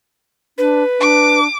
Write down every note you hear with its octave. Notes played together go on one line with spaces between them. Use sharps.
D4 B4
D4 D6